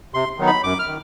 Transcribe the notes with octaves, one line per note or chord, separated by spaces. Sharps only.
C3 C6
D#3 F#3 B3 D#4
B5
F#2 D6
F6
D#3